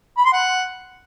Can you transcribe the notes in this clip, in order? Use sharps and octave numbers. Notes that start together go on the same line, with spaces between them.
B5
C6
F#5